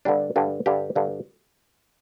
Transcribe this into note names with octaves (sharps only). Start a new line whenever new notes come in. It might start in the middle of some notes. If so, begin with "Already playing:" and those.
G2 D3 G3 D4
G2 D3 G3
G2 D3 G3 G4
G2 D3 G3